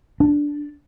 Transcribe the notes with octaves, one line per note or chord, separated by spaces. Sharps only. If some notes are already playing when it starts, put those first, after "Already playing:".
D4